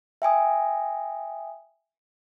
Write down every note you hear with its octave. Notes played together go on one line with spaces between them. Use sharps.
E5 G5 G#5 D#6